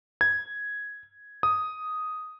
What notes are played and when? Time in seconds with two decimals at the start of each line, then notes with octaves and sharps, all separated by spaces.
0.21 G#6
1.43 D#6